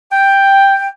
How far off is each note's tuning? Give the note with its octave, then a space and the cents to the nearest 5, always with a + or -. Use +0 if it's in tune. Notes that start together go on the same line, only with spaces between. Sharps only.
G5 +5